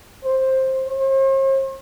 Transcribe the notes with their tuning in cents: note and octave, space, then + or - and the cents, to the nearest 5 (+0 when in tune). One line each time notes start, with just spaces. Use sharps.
C5 +10
C5 +45